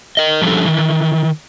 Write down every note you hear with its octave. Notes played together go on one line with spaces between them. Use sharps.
A#4 D#5
F3 G3 C#4 D4 A4
D#3 E3